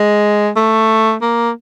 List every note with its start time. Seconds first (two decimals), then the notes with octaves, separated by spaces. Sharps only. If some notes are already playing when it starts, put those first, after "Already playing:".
Already playing: G#3
0.56 A3
1.22 A#3